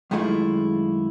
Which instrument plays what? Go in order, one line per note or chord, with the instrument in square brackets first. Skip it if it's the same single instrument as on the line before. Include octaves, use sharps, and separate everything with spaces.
[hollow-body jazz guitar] F#2 D#3 G#3 A3 E4 F4